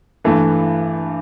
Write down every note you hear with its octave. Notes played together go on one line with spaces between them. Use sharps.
G2 E3 A3